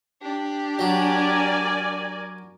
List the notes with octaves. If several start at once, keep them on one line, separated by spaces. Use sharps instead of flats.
D4 G4
F#3 A#4 D5 G#5